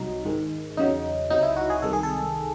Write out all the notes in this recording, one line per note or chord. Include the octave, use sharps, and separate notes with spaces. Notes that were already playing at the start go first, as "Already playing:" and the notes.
Already playing: C2 C3 F#3 D#4
G#2 D#3 G#3
E2 C#3 F#3 D#4
C#2 C3 F#3 D#4
E4
F#4
G#4
C2 C3 D#3 G#3 A4
G#4
A4